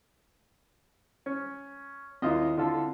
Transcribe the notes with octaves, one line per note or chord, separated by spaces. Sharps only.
C#4
D#2 C4 E4 F4 D#5
D3 F4 A4